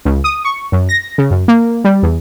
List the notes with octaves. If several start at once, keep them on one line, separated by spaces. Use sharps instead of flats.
C#2
D#6
C#6
F#2
A#6
C#3
F#2
A#3
G3
E2